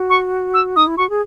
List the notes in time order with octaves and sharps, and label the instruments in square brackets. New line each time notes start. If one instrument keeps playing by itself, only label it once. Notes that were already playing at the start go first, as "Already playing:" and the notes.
Already playing: [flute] F#4
[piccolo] C#6
E6
[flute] D#4 [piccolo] D#6
[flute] E4
[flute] F#4 [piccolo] C#6
[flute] G#4